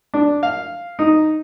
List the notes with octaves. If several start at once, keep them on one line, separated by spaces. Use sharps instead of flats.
D4
F5
D#4